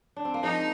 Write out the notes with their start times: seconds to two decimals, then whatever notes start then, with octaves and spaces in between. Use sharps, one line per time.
0.16 D4
0.25 C4
0.34 A#3
0.43 F3 G#3 D#4